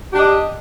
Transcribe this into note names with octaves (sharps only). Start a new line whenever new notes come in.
D4 G4 D#5